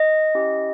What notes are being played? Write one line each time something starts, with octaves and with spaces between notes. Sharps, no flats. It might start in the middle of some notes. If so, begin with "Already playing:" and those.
Already playing: D#5
C#4 E4 G4